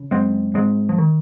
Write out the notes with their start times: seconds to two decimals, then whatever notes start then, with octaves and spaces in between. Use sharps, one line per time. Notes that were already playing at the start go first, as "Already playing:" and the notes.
Already playing: C#3
0.11 F#2 G#3 C4
0.54 G#2 G#3 C4
0.89 F3
0.98 D#3